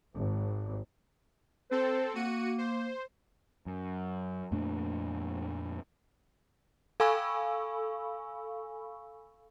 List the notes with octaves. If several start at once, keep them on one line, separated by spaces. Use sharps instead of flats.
G#1
C4 A4 C5
A#3 F#4 C#7 D#7
C5
F#2
F2 A#2 A3 D4
A4 F5 G#5 B5 C#6 E6